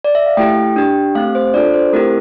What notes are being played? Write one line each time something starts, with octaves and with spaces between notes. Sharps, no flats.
D5
E5
F5
A3 E4 G4 G5
D4 G4
A3 C4 G4 F5
C5
D4 F4 A4 D5
C5
A3 C4 E4 G4 A#4